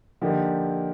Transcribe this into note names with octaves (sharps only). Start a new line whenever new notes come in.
D3 F3 A#3 D#4 G4